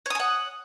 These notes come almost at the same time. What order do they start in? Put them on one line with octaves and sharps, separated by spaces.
C#5 D#6 G#5 F#5